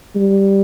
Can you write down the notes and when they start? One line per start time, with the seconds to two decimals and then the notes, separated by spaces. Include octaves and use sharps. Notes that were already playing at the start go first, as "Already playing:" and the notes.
0.16 G3